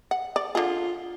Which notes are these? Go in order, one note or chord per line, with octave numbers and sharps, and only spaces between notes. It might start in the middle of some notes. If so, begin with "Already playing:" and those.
F#5
D5
D3 F4 G#4